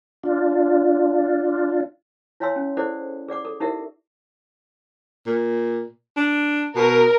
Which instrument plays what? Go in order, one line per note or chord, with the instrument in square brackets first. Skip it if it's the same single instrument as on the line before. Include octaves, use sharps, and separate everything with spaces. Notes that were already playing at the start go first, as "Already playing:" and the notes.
[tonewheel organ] D4 F4
[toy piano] E4 C#5 F5 G#5 C6 E6
C#4
E4 G#4 A4 C5 D5 F#5
G#4 D5 F#5 D6
A4
D#4 E4 G4 A#4 E5 F#5
[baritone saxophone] A#2
D4
[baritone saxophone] B2 [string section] A#4